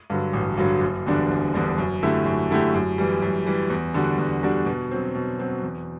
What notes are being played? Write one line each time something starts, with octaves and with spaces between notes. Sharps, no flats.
G2 D3 F#3
A1
G2 D3 F#3
F#1
E2 D3 G3 D4
F#1
E2 D3 G3 D4
F#2
D3 A3 E4 G4
F#2
D3 A3 E4 G4
F#2
E3 G3
F#2
E3 G3
E2
D3 G3 D4 F#4
E2
D3 G3 D4 F#4
B2
F#3 C4
B2
F#3 C4
E2